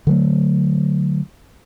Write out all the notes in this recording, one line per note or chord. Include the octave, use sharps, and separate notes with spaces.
D3 F#3 A3